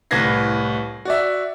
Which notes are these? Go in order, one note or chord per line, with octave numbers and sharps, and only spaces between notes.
C2 A2 B4 G#6 A#6 C7
F#4 D5 E5